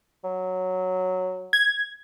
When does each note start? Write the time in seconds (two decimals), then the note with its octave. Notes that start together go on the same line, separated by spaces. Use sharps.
0.24 F#3
1.53 G#6